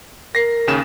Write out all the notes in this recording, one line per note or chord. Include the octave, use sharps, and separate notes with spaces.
A#4 A#6 C7
D#2 C#3 E7